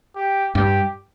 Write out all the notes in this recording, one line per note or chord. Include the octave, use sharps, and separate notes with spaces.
G4
G2 G4